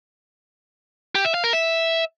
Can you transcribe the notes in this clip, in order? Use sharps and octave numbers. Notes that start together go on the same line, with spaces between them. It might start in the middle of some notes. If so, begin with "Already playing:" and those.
G4
E5
F5
A#4
E5